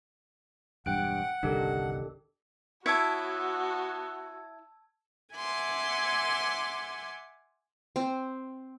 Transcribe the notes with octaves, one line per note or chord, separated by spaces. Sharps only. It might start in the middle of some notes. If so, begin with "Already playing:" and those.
E1 G2 F#5 G5 F#6 D7
G1 C2 D#3 D4 G4 A4
B3 E4 F#4 C#5 A5 C#6 E6 G#6
E5 F#5 G#5 C6 D6
C4